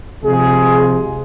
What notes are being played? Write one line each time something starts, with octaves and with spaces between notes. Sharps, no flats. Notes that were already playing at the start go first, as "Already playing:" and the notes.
C3 F3 G#3 G#4